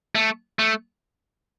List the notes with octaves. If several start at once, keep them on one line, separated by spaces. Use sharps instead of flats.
A3
A3